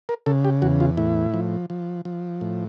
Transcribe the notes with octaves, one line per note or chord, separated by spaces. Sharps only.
A#4
C#3 A4
G4
E2 F#4
F4
A2 E4
F3
F3
F3
A2